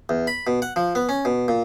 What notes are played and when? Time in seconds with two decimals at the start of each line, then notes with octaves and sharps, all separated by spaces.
0.09 E2
0.27 B5
0.47 B2
0.62 F#5
0.76 F3
0.95 B3
1.09 C#4
1.25 B2
1.48 A#2